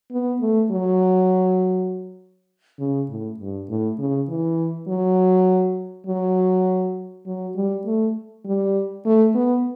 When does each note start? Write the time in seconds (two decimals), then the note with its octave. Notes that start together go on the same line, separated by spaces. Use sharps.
0.11 B3
0.41 A3
0.71 F#3
2.80 C#3
3.09 A2
3.40 G2
3.69 A2
3.99 C#3
4.29 E3
4.87 F#3
6.07 F#3
7.27 F#3
7.56 G3
7.86 A3
8.45 G3
9.05 A3
9.35 B3